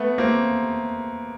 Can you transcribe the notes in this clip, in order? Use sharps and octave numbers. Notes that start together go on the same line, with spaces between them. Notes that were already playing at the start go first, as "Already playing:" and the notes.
Already playing: A3 B3
A#3 C4